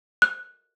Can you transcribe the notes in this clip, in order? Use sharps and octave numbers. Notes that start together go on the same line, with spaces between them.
F#6